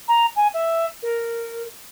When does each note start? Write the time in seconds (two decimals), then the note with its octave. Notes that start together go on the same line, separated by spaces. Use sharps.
0.08 A#5
0.36 G#5
0.53 E5
1.02 A#4